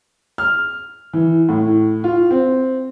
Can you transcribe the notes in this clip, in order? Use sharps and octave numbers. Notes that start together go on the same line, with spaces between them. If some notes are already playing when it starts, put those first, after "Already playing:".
F6
E3
A2
F4
C4